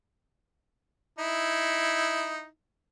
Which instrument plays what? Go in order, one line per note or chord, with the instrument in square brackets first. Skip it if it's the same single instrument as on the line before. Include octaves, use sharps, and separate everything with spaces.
[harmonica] D#4 E4